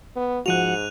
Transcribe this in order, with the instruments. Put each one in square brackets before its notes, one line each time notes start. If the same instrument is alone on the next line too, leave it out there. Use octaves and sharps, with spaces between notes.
[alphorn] B3
[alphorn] G#2 [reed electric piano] F3 F#4 [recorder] F#5 [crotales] F#6 D#7 F7